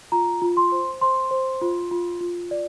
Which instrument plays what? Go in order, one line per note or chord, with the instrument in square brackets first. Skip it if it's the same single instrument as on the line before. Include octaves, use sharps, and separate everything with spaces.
[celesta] F4 A#5
F4
C6
C5
C5 C6
C5
F4
F4
F4
D5